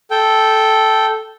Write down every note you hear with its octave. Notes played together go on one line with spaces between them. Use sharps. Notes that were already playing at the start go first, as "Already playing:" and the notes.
A4 G5